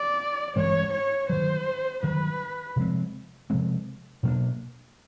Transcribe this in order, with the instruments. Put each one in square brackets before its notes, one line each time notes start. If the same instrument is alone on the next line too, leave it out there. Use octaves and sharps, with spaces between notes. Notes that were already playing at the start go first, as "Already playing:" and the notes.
Already playing: [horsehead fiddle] D5
[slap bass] G2 E3 G#3 C4 [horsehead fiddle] C#5
[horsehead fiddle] C#5
[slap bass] G2 D#3 F#3 [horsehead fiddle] C5
[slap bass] G2 D#3 F#3 [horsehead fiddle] B4
[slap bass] C3 F3 G#3 C4
C3 F3 G#3 C4
B2 F#3 A#3 D4